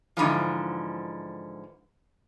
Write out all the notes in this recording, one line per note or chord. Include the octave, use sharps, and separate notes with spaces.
G#2 D3 E3 F3